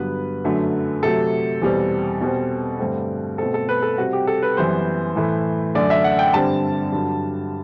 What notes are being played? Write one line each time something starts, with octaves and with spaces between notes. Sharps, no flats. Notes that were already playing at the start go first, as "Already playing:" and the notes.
Already playing: G2 D3 F#3 B3 B4
F#2 D3 F#3 A3
C3 F#3 A3 A4
E2 B2 G3 C4
B2 G3 C4
G2 D3 A3 C4
B2 A3 C4 A4
A4
B4
A4
C3 G3 C4 F#4
G4
A4
B4
F#2 E3 G3 B3 C5
A2 E3 A3
F#2 D3 A3 D5
E5
F#5
G5
G2 D3 G3 C4 A5
G2 D3 F#3